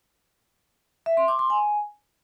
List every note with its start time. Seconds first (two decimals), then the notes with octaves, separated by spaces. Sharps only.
1.06 E5
1.17 C6
1.28 D6
1.39 C6
1.50 G#5